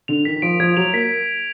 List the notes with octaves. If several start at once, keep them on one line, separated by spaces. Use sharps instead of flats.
D3 F7
D#3 B6
D#3
F3 D7
F3 G#6
F#3 F7
A#3 B6